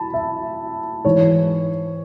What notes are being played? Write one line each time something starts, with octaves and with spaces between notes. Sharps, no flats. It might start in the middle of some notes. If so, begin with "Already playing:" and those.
Already playing: A5 B5
E5
G#2 E3 C#5